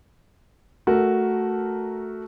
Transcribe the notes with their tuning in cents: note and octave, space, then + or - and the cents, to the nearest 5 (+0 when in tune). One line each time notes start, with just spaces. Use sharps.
A3 +0 F#4 +0 A#4 +0